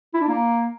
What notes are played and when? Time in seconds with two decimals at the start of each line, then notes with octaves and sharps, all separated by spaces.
0.14 E4
0.21 D4
0.28 A#3